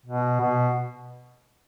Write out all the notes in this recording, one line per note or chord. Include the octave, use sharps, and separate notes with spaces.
B2
B2